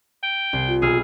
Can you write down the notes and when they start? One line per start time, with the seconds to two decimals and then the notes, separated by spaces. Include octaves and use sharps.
0.23 G5
0.53 C2 C7
0.68 F4
0.82 B1 G#4 E6 F6